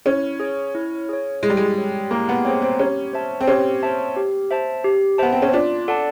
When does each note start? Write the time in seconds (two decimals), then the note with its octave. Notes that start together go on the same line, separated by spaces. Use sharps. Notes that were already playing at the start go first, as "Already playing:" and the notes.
0.06 C#4 E4
0.40 G#4 C#5
0.75 E4
1.09 G#4 C#5
1.42 G#3 E4
1.50 G3
1.57 G#3
1.76 G#4 C#5
2.10 A#3 E4
2.29 B3
2.45 C4 G#4 C#5
2.62 C4
2.79 C#4 G4
3.13 C5 E5 A5
3.41 C4
3.48 C#4 G4
3.83 C5 E5 A5
4.16 G4
4.51 C5 E5 A5
4.84 G4
5.18 B3 C5 E5 A5
5.32 C4
5.42 C#4
5.53 D4 F4
5.88 A4 D5 F#5 A5